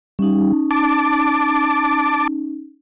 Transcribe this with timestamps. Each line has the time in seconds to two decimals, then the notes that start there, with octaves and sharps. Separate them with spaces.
0.19 G3 C#4 D#4
0.71 A5 D6